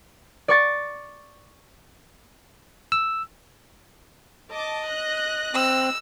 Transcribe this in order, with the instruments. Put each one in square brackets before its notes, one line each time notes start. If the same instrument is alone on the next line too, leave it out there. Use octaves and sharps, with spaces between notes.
[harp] D5 C#6 A6
[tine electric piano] E6
[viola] D#5 [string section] A5 D6
[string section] F#6 A#6
[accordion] C4 [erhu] E6